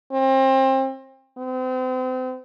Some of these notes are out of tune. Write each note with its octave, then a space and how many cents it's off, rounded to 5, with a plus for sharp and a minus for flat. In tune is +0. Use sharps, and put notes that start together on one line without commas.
C4 +30
C4 -35